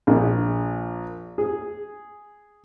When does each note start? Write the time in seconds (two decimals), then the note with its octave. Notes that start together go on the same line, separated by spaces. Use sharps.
0.07 A#1
1.38 G#4